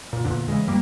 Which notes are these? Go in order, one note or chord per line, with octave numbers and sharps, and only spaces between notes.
A#2
E2 A#2 D3
C#3 E3 G#3
G2 G3 A#3